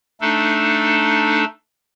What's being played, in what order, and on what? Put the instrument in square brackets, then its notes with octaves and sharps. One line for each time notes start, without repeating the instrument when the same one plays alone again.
[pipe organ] A3 D4 D#4 A4